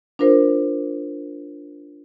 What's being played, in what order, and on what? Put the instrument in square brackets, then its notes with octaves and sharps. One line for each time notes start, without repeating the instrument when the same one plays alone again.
[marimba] D4 F4 A#4 C5